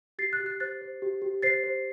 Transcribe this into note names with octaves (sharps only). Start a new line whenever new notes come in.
G4 A6 C7
F#6 A6
G4
F#6 A6
C5 F#6 A6
C5
G4
G4
C5 A6 C7
C5